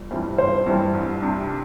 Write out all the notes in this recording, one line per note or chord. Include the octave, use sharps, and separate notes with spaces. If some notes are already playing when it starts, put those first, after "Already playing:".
Already playing: G1
G2 E3 G3 C4
G1 C5
G2 E3 G3 C4
C2
C3 G3 D4